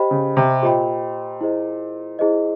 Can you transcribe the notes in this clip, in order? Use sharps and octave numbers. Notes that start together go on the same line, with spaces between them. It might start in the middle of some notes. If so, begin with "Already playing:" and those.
Already playing: G4 C5 D#5 G5 B5
C#3
C3
A#2 G4 C5 D#5 G5 B5
E4 G#4 C5 D#5
E4 G#4 C5 D#5